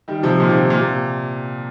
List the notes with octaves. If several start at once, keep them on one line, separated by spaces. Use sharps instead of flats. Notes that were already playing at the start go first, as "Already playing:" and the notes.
D#3 G3
C3 F3
A#2 D#3
C3
A#2
C3